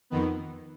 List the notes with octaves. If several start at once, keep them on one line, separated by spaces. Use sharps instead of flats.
F2 D#3 B3